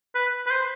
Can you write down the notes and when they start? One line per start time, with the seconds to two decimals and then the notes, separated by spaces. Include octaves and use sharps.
0.15 B4
0.46 B4
0.51 C5